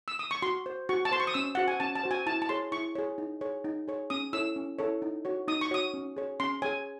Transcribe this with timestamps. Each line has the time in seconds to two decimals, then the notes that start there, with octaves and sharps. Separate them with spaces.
0.08 E6
0.19 D#6
0.31 C#6
0.42 F#4 C6
0.66 C5
0.89 F#4 C#6
1.05 A5
1.11 C5 C6
1.20 C#6
1.27 D#6
1.34 C#4 E6
1.55 F#4 C5 F#5
1.68 G#5
1.80 C#4 A5
1.95 A5
2.03 F#4 C5
2.11 G#5
2.26 E4 A5
2.42 A5
2.49 G#4 C#5 C6
2.72 E4 C#6
2.95 G#4 C#5
3.18 D#4
3.41 G#4 C#5
3.65 D#4
3.88 G#4 C#5
4.10 C#4 D#6
4.33 E4 A4 C#5 E6
4.56 C#4
4.79 E4 A4 C#5
5.02 D#4
5.25 F#4 C#5
5.48 D#4 D#6
5.61 C#6
5.71 F#4 C#5 D#6
5.94 C#4
6.17 G#4 C#5
6.40 C#4 C6
6.62 G#4 C#5 G#5